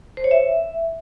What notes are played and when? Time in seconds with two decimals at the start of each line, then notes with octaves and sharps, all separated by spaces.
0.17 C5
0.24 C#5
0.31 E5